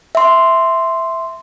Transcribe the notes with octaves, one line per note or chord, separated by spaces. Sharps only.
E5 C6